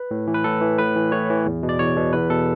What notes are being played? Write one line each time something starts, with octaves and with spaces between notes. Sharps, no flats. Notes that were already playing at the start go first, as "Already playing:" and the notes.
Already playing: B4
A2
E3
B4
A2 A4
E3
A2 B4
E3
A2 C#5
E3
E2
B2
D5
E2 C#5
B2
E2 B4
B2 A4